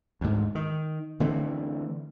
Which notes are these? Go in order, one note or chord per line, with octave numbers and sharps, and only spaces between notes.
D2 G#2
D#3
D3 E3 A3 C4